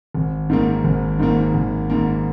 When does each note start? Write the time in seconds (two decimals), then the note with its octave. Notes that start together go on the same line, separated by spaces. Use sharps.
0.14 G#1
0.50 G#2 D#3 A#3
0.84 G#1
1.19 G#2 D#3 A#3
1.54 G#1
1.90 G#2 D#3 A#3